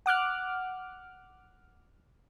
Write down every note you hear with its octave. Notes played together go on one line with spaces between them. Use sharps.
F#5 D6 F6 F#6